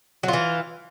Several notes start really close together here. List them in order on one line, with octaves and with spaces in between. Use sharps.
F#3 F4 E3